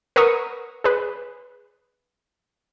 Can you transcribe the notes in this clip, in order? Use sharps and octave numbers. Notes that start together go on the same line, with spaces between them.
A#4 B4 F#5 C#6 D#6
G#4 B4